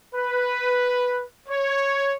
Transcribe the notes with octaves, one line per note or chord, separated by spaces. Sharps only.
B4
C#5